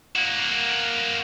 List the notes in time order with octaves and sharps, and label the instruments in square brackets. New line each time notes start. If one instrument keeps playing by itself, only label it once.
[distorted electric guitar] A#3 F#4